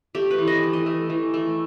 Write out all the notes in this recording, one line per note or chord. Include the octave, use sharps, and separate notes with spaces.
A3 G4
B4
E3
D#5
A3
D#5
A3
E3
A3